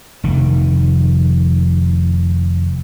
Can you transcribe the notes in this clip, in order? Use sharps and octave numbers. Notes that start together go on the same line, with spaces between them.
F1 D#3